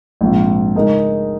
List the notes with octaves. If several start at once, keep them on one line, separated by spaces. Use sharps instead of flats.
A#1 G#2 F3 C4 F4
C#3 G#3 D#4 A#4 D#5